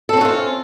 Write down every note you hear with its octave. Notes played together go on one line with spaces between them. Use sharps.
C4 C#4 F4 F#4 A4